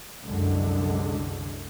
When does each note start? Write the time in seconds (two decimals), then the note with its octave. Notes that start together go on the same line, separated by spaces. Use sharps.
0.25 C2 F#2 D3 G#3